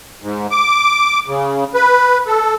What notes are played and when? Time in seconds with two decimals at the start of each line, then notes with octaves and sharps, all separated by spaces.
0.22 G#2
0.51 D6
1.28 C#3
1.74 B4
2.27 A4